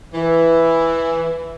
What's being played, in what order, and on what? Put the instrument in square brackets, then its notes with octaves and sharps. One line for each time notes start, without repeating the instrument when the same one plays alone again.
[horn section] E3